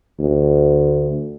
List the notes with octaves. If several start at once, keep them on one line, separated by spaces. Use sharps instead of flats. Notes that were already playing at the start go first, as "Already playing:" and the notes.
D2